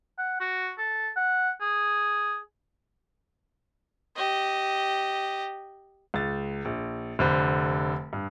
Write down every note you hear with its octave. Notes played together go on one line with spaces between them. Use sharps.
F#5
F#4
A4
F#5
G#4
G4 D#5
C#2 A6
A#1
F1 D3 C5 B5
G2